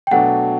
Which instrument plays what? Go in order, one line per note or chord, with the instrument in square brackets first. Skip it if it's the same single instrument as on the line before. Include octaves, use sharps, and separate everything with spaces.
[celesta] G5
[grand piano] B2 F#3 A3 D4 [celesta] F#5